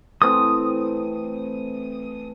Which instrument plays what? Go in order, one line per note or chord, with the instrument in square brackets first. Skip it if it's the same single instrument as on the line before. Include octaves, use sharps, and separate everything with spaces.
[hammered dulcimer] E3 A3 C4 [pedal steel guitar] D#6